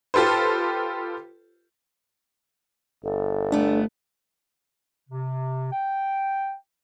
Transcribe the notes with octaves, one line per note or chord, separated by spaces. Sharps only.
F4 G4 A4 B4 C5
G1 A4
A3 B3 D4
C3
G5